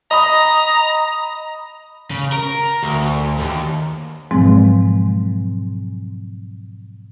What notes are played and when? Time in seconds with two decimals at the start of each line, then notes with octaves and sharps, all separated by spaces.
0.11 D#5 A#5 B5 D#6
2.11 C#3
2.32 A#4
2.83 D2
3.38 D#2
4.31 G#2 B2 F3 F#3 G#3 C4